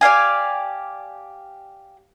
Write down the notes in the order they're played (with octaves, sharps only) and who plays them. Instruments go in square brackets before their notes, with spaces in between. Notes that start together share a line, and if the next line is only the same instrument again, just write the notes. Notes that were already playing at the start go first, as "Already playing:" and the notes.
[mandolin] G4 D5 F5 G#5